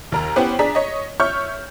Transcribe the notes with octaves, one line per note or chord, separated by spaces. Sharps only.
D#2 A#4 A#5
B3 C#4 E4 G4 B4 C5
D4 G#4 D5 A#5 B6
C#5 D#5
C#5 E5 C#6 F6 G6